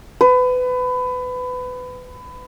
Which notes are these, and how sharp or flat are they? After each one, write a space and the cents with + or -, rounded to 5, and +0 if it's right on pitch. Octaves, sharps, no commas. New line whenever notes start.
B4 +25